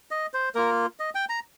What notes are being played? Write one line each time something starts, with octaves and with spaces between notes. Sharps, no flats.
D#5
C5
A#3 F4 A#4
D#5
G5
A#5